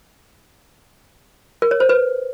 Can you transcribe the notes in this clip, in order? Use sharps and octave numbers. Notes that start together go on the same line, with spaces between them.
A#4
C#5
C5
B4